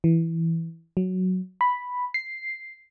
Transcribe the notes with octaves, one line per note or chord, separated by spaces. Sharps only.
E3
F#3
B5
C7